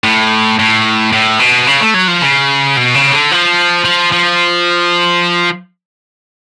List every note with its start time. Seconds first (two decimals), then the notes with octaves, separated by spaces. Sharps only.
0.04 A2
0.59 A2
1.13 A2
1.40 B2
1.67 C#3
1.81 A3
1.94 F#3
2.08 F3
2.22 C#3
2.77 B2
2.95 C#3
3.12 D3
3.31 F3
3.85 F3
4.12 F3